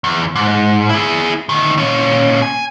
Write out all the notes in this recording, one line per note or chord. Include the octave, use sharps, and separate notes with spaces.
E2
G#2
E4 G#4
D2 D#3
A#2 C#4
G#5